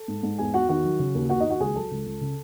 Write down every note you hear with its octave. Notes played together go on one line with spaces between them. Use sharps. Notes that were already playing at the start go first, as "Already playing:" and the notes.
Already playing: A4 A5
G#2
G#2
E2 G#4 G#5
E2 F#4 F#5
D#3 F#4 F#5
F#3
C#3
D#2
D#2 F#4 F#5
D#4 D#5
D#2 F#4 F#5
C#2 G#4 G#5
F#3 A4 A5
C#2
C#2
C#3